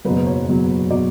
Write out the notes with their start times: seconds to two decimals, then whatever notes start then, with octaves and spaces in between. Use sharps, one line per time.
0.05 F#1 E2 B2 F#3 B4
0.27 C#5
0.48 F#1 E2 B2 F#3
0.91 B2 F#3 D5